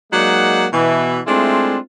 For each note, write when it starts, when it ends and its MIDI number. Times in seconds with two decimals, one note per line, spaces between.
0.13 0.66 54
0.13 0.66 56
0.13 0.66 58
0.13 0.66 63
0.13 0.66 74
0.13 0.66 78
0.73 1.19 47
0.73 1.19 52
1.27 1.77 56
1.27 1.77 57
1.27 1.77 60
1.27 1.77 62
1.27 1.77 64
1.27 1.77 65